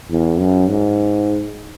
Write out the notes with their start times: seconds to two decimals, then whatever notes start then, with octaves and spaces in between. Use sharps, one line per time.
0.10 E2
0.39 F#2
0.69 G#2